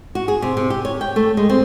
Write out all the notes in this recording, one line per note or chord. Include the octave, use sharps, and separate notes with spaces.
F#4
G#4
C3
C3
G4
C#5
G5
A3
G#3
C4